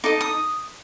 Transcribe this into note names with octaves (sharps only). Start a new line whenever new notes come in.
D#4 A4 D#5 D6
D#6